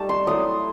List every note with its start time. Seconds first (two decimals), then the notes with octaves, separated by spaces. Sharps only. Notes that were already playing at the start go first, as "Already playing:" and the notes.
Already playing: G3 A3 D#4 A5
0.09 C6
0.26 F#3 A3 E4 D#6